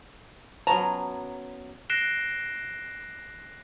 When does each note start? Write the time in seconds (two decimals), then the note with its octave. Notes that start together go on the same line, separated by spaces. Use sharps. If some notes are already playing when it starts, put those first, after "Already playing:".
0.67 F#3 B3 C#4 A5 A#5
1.90 F#6 A#6 C7 D7 E7 G7